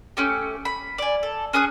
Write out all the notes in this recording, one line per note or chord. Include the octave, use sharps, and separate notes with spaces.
A3 C#4 G4
B5
D5 G#5
A4
C#4 G#4 D#6 F#6